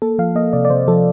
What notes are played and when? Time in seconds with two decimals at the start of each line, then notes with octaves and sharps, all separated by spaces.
0.02 A#3 A4
0.19 F3 F5
0.35 A#3 D#5
0.53 C3 D5
0.65 D5
0.70 C3 C5
0.88 F3 A4